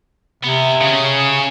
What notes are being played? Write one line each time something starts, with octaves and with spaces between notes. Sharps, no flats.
C3 B3 E4
C#3 C#4 G#4